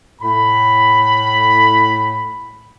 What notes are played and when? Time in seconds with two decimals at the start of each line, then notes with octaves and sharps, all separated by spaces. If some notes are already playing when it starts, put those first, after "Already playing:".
0.22 A2 B5